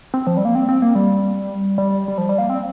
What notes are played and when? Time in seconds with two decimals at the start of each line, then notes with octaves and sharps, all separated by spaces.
0.14 C4
0.27 F3
0.37 G3
0.45 A#3
0.55 C4
0.69 C4
0.82 A#3
0.95 G3
1.78 G3
2.08 G3
2.18 F3
2.29 G3
2.38 A#3
2.50 C4